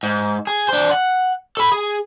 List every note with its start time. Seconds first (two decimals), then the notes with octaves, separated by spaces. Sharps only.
0.03 G#2
0.47 G#4
0.69 D4 C5
0.91 F#5
1.57 A4 B5
1.72 G#4